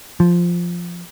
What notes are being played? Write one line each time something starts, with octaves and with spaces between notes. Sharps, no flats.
F3